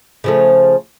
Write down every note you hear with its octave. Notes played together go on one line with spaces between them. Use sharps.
C#3 F3 A3